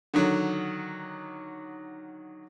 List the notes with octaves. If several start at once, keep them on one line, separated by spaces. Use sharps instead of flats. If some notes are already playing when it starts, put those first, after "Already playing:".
D3 D#3 F#3